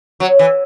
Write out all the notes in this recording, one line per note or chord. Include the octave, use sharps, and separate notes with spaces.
F#3
E3